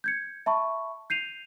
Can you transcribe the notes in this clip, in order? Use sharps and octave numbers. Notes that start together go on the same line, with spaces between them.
G6 G#6 C#7
E5 A5 B5 C#6
G6 C7 D#7 F7